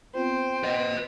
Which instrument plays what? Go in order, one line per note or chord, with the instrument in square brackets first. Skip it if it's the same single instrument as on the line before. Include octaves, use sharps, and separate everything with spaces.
[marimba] B3 C4 F4 [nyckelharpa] C5 [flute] G5
[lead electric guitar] B4 D#5